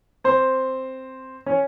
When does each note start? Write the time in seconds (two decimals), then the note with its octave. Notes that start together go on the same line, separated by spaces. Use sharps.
0.24 C4 C5
1.46 C#4 C#5